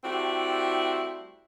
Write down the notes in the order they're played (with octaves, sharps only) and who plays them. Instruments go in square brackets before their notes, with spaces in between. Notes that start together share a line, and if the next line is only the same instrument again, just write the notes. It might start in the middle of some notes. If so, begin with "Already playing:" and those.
[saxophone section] G3 A3 C4 E4 F#4